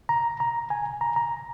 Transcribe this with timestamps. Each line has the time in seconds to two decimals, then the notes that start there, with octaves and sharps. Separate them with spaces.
0.09 A#5
0.40 A#5
0.70 G#5
1.01 A#5
1.16 A#5